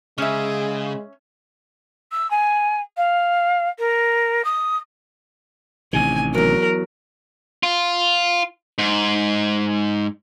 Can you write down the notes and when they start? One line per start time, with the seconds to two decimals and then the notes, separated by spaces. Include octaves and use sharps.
0.18 C#3 G#3 C#4 G#4 E5
2.11 E6
2.30 G#5
2.97 F5
3.79 A#4
4.44 D#6
5.93 A1 C3 D#3 G#5
6.34 E2 F#3 A#4
7.63 F4
8.78 G#2